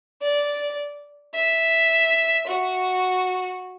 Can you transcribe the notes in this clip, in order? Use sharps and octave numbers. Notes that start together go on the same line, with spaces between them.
D5
E5
F#4